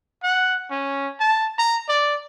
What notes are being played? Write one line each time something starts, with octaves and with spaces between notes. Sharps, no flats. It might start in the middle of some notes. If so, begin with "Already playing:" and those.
F#5
C#4
A5
A#5
D5